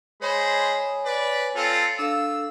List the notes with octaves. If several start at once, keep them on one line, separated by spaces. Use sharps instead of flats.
G#3 C5 C#5 G#5 B5
B4 D5
C4 F4 A4
D4 A4 F5 E6